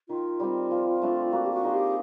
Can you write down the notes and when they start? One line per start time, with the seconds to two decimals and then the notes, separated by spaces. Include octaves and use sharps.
0.09 D#3 F4
0.40 G3 C4
0.71 F3
1.02 A3 D4
1.32 A#3 F#4
1.46 G4
1.53 F#4
1.63 D#4 G#4 C5
1.74 G4